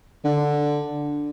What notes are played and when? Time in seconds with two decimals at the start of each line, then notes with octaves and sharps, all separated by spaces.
0.24 D3